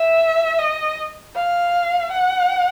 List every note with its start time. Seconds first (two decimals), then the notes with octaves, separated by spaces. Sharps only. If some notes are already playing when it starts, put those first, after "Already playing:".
Already playing: E5
0.59 D#5
1.36 F5
2.12 F#5